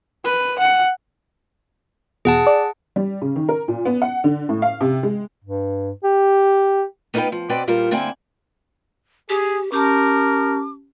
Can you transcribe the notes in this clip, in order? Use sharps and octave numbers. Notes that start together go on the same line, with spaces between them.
B4
F#5
E2 B2 G#4 F#5 A5
D5
G3
C#3
D#3
A#4
A#2
B3
F#5
D3
A2
F5
C3
G#3
G2
G4
B3 D#4 F4 A4 B4 G5
F3
B2 C4 B4 D5 G5
A#2 G3 F4 A#4 C5
D3 A#3 C4 E4 G5 G#5
G4 G#4
C#4 G4 A#4 A5 D6